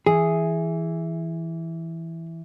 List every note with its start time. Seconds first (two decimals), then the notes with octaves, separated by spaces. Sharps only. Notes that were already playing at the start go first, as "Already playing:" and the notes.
0.06 E3 G#4